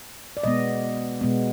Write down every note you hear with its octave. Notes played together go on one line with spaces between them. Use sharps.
D5
B2 G#3 B3 D#5
B2 G#3 B3